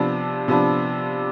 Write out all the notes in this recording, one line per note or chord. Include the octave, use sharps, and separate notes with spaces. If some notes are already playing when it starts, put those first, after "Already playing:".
Already playing: C3 F3 B3 D4
C3 F3 B3 D4